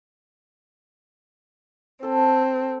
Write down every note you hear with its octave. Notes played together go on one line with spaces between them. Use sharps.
C4 A4 A5